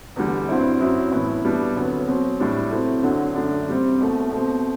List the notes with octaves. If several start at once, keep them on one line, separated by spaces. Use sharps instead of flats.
E2 D3 G3
G2 F#3 C4 E4
F#2 F#3 C4 E4
A2 E3 B3 E4
B2 G3 B3 D4
D2 C3 F#3 B3
B2 F#3 C4
A2 G3 D4
C3 F#3 A3 C4 E4
D2 D3 F#3
F#2 D3 A3 D4
C3 G3 C4
C2 B2 A3
B2 A3 C4